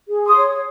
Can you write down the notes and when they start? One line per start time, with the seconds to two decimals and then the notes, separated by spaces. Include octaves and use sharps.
0.08 G#4
0.27 C6 D#6
0.35 C#5